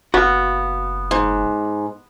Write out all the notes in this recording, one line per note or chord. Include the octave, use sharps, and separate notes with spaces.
F#1 B3 F#4 F5
G#2